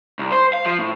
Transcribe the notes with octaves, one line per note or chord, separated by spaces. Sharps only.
C2
C5
F5
F3
A2